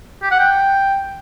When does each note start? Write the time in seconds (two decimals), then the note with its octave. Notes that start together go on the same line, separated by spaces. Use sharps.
0.22 G4
0.31 F#5
0.40 G5